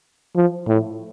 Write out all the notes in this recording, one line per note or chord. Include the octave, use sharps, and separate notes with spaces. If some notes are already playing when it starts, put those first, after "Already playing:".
F3
A2